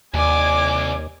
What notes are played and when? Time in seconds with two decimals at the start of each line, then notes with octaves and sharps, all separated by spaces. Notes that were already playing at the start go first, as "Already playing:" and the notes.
0.14 D#2 C3 D5 G#5 D6